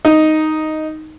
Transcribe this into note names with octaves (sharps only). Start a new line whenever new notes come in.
D#4